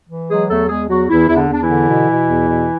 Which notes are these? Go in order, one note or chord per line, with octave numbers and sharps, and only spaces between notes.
E3
F#3 G#3 G#4
E2 A3 A4
E2 G#3 G#4
E2 F#3 F#4
E2 E3 E4
E2 E4
D3 D4
E2 D4
E3 E4
D3
B2
B2
E2
B2